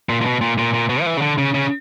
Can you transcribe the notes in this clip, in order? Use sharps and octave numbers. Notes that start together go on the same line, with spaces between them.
A#2
A#2
B2
A#2
A#2
A#2
B2
F3
E3
C#3
D3
C#3
C#3